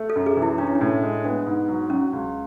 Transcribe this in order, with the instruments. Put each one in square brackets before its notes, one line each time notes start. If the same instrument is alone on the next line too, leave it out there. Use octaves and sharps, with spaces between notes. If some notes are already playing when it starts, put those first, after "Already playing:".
Already playing: [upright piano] A3
[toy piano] A4
[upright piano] F#2
[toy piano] G#4
[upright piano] E3
[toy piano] E4
[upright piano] C#4 [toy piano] D4
[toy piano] E4
D4
[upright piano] A2
G#3
[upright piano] B3 [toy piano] D4
[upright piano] G#2
F#3
[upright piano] F#3 [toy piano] C#4
[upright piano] C#2